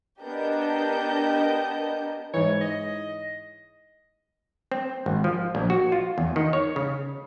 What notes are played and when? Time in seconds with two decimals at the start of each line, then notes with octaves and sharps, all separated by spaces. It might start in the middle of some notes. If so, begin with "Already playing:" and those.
0.21 B3 D4 G4 A#4 D#5 G6
2.34 G#2 E3 C#5
2.61 D#5
4.72 C4
5.06 G#1
5.24 F3
5.55 A#1
5.70 F#4
5.92 F4
6.18 E2
6.36 D#3
6.53 C#5
6.76 C#3